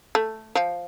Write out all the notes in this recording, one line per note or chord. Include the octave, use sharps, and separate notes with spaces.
A3
F3